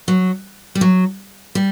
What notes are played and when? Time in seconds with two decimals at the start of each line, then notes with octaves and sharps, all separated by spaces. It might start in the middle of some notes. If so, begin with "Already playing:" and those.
0.08 F#3
0.75 G3
0.81 F#3
1.55 G3